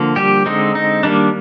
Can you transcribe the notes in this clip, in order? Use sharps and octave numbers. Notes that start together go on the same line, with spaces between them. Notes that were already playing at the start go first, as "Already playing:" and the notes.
Already playing: D3 F3 A#3
G3 G4
D3 G#3 C4 D#4
D#4
D#3 G3 A#3 D4